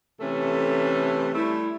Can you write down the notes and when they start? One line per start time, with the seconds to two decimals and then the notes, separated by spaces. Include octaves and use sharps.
0.20 C3 E3 A3 C#4 A4
1.35 G3 A3 E4